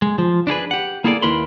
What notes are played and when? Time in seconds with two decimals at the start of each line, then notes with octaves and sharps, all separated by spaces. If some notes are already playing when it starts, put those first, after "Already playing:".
0.02 G#3
0.18 F3
0.47 D4 E4 G#4 B4
0.71 G4 F#5
1.04 A#3 E4 G#4 A4 C#5 D5
1.22 D#2 E4 A#4 B4 B5 C6